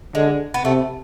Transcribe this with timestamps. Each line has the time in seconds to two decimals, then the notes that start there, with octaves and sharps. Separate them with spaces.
0.15 D3 G#3
0.54 B3
0.64 C3 A3